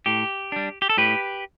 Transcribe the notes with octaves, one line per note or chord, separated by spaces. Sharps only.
A2 G4
G3 D4
G4
A4
A2 G4 B4